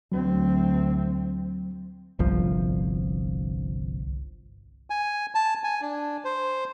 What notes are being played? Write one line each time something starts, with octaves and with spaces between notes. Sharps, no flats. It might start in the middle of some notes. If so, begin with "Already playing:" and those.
D2 F#3 C4
G1 C2 F3
G#5
A5
G#5
D4
C5